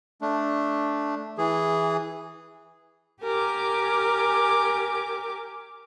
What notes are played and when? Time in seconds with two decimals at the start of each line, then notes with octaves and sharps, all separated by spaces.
0.21 A3 D4
1.38 E3 G#4
3.22 G4 A#4 G#5 D6